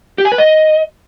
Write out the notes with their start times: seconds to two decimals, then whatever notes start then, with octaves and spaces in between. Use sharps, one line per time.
0.18 G4
0.25 G#5
0.32 B4
0.38 D#5